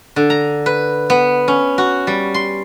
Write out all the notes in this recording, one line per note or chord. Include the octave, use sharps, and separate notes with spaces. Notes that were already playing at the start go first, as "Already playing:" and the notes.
D3
A#5
B4
B3
C#4
F#4
G3
C6